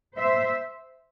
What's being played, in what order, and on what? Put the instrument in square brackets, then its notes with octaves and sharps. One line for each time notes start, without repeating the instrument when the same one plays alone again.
[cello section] C5 E5